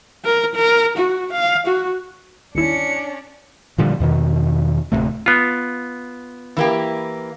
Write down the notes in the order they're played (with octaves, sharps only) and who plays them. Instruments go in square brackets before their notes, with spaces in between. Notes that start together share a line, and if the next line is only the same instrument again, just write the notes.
[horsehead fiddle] A#4
A#4
F#4
F5
F#4
[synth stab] G1 D#2 E4 [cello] C#4 D4 [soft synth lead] C#7
[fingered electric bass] A#2 D3 F3 G3
E2 B2 D#3
D1 C2 C3 A3
[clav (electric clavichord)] B3 F4
[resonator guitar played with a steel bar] E3 A#3 G4